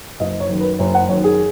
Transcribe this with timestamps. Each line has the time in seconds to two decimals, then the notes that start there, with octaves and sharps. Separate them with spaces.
0.20 F#1 D#5
0.40 C#5
0.50 F#2 D#3
0.60 B4
0.79 F#1 C#5
0.94 F#5
1.09 F#2 C#5
1.13 D#3
1.24 G#4